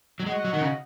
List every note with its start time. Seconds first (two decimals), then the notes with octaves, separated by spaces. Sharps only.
0.20 F#3
0.26 G#3 F#4 D#5 F#5
0.45 F#3
0.53 D#3
0.61 C#3